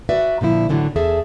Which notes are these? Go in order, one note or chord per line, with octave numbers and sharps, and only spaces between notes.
F#4 B4 D5 E5
A#2 D3 F3 E4
A2 D3 E3 F#3
E2 G#4 A4 E5